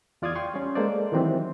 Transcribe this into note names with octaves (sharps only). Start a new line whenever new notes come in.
E2 F4 D5 F5 D#6 G#6
G5 C6 C#6
G3 C#4
G#3 A#3 A4 C5 D5
D#3 E3 F#3 C4 G4